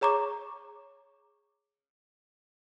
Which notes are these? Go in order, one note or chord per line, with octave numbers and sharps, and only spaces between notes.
G#4 C#5 A#5 C#6 D6